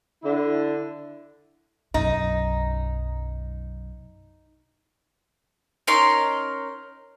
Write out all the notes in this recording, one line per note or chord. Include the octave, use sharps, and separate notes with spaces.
D3 E4
B1 F#2 D#4
C#4 D#4 A#4 C6